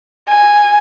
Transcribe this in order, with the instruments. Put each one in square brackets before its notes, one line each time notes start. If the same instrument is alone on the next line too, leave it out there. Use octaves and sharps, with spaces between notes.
[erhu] G#5